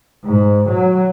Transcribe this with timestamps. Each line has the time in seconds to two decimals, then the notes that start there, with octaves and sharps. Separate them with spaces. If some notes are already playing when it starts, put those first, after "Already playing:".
0.25 G#2
0.69 F#3